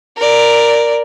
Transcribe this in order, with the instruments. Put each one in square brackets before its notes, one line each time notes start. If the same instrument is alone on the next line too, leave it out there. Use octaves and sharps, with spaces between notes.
[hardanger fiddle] A#4 D5